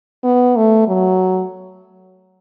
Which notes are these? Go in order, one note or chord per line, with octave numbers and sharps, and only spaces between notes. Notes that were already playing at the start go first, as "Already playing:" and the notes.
B3
A3
F#3